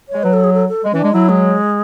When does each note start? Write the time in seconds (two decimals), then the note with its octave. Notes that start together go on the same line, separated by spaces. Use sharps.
0.09 G#3 C#5
0.23 F#3 B4
0.33 A4
0.44 G#4
0.54 A4
0.69 A4
0.84 G#3
0.93 E3 C#4
0.99 G#3 D4
1.13 F#3 E4
1.29 G#3